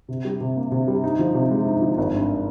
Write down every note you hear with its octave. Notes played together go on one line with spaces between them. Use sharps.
C3
G3
C3
A#3
C3
G3
D#4
F3
C3
G#3
D#4
F3
G#1
G2